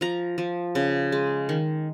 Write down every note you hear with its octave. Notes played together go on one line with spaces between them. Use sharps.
F3 A#5
F3
C#3
G#3
D#3